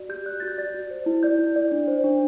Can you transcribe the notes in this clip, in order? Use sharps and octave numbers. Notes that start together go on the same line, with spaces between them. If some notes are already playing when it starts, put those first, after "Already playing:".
Already playing: F#4 D5
G4 G6
D5 F#6
F#4 A6
G6
D5 A6
F#4
C5
E4
D5 G6
E4
D5
D4
C5
D4